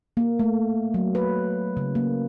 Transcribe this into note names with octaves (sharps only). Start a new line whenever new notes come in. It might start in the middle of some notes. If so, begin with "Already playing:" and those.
A#3
A3
F#3
B4
C#3
A#3